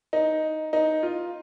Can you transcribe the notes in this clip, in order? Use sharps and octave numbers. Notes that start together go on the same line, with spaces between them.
D#4
D#4
F4